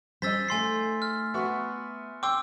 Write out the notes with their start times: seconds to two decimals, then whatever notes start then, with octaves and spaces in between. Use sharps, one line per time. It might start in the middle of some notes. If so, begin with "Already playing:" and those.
0.22 G3 C#4 C5 D#5 E6 A6 B6
0.48 A3 D#4 G#5 C6 C7
1.02 F6
1.34 B3 F#4 E5 G#5 C#6
2.23 G5 C6 D6 E6